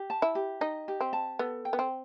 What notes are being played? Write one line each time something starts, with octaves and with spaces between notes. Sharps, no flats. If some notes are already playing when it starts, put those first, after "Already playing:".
Already playing: G4
A5
E4
G4
D#4 D#5
G4
C4
A5
B3 A4
G5
B3
C4